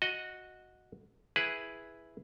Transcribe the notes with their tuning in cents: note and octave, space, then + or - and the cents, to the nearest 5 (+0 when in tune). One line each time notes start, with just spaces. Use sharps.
F#4 -10 D#5 +0
E4 +0 G#4 +0 B4 +0